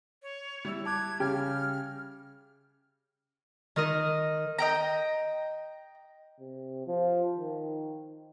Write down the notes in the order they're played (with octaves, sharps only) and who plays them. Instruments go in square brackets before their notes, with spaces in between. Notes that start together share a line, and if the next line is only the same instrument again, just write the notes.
[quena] C#5
[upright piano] G3 E4 E6
[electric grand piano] A5 D6 F#6 [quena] G#6
[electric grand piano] C#3 G5 G#6 [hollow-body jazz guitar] G4 [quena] F6
[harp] D#3 A#4 D#5
[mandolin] D#5 G5 A#5
[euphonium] C3
F3
D#3